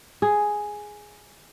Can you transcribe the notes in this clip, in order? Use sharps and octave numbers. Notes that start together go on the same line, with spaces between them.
G#4